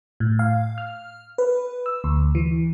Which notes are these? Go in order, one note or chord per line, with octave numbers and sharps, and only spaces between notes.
A2
F5
F6
B4
E6
D2
E3